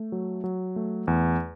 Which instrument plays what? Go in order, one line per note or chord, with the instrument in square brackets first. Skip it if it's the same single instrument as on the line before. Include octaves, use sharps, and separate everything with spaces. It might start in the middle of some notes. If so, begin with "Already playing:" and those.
Already playing: [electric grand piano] A3
F#3
F#3
A3
E2